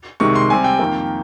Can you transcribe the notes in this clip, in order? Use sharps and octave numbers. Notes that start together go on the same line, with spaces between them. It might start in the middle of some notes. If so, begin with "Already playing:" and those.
C2 C3 D#3 G#3 C#6
C6
C3 G3 C4 G#5
G5
F2 D#3 A#3